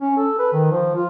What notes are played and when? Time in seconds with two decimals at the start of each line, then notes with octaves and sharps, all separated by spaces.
0.01 C#4
0.17 A4
0.39 B4
0.53 D#3
0.71 F3
0.95 F4